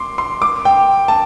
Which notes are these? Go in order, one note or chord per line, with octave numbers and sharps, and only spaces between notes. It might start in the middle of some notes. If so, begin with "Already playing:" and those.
Already playing: C6 D6
C6
D6
G5
A5